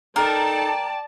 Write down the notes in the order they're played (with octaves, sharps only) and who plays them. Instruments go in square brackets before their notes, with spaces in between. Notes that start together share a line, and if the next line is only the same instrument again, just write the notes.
[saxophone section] D#4 A4 [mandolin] A#4 [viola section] D5 A5 [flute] G5